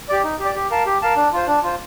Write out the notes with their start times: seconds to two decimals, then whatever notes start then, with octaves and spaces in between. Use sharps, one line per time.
0.09 G4 D5
0.24 D#4
0.39 G4
0.45 D5
0.55 G4
0.71 A#4 F5 A5
0.86 G4
1.02 A#4 F5 A5
1.16 D4
1.33 F4 C5
1.47 D4
1.63 F4 C5